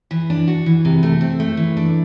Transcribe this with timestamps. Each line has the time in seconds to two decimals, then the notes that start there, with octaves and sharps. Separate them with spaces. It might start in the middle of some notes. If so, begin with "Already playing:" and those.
0.11 E3
0.30 D4
0.48 F#4
0.66 E3
0.85 C3
1.03 A3
1.21 C4
1.40 A3
1.57 E3
1.77 D4